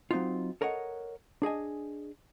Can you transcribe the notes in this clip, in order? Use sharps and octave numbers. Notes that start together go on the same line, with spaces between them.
F#3 C4 D#4 F4
A4 A#4 C#5 D#5 F#5
D4 G#4 D#5 G#5